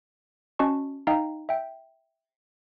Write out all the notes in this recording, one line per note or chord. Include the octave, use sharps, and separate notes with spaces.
C#4 F#4 D#5 A5 C#6
D#4 D#5 F5 G5 A#5
E5 G5